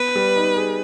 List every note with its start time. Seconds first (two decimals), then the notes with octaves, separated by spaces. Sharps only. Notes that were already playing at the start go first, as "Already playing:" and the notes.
Already playing: B3 B4
0.15 G3
0.36 D#4
0.56 G#4